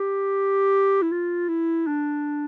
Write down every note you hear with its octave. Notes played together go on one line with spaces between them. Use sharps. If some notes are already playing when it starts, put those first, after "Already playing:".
Already playing: G4
E4
F4
E4
D4